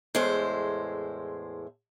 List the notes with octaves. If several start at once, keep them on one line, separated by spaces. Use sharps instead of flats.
E2 A2 G#3 A4 C5